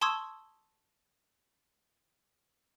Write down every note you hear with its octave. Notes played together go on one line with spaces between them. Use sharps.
A5 C6 C#6 D#6 E6 G#6